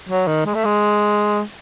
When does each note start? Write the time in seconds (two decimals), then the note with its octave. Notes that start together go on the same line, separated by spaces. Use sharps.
0.09 F#3
0.27 D#3
0.45 G#3
0.55 A3
0.65 G#3